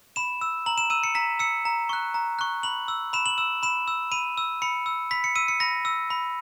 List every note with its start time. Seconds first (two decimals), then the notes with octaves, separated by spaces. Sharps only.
0.16 B5 E7
0.41 E6
0.66 A#5 F#7
0.78 E7
0.90 E6 D#7
1.03 C#7
1.15 A#5 B6
1.39 E6 C#7
1.65 A#5
1.89 C#6 F#6
2.14 A#5
2.39 C#6 F#6
2.63 B5 F#7
2.88 E6
3.13 B5 E7
3.26 F#7
3.38 E6 E7
3.63 B5 E7
3.88 E6
4.12 B5 D#7
4.38 E6
4.62 B5 C#7
4.86 E6
5.11 B5 B6
5.24 C#7
5.36 E6 D#7
5.48 C#7
5.60 B5 A#6
5.85 E6
6.10 B5